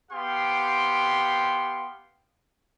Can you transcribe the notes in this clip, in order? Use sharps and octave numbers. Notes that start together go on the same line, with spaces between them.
B3 G4 F5 G5 C6